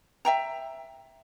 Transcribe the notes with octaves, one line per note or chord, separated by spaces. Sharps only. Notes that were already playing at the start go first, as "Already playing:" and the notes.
E5 G5 A#5